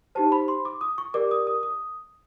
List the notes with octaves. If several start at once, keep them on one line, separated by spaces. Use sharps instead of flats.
D#4 G4 C5 A5
B5
C6
D6
D#6
C#6
G4 A#4 D5 D6
D#6
D#6
D#6